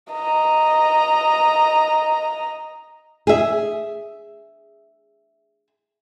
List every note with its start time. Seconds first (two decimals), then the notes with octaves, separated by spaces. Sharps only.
0.12 D#5 A#5
3.27 G#4 E5